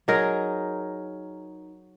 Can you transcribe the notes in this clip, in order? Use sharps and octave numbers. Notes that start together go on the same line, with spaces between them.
F#3 D#4 G#4 A#4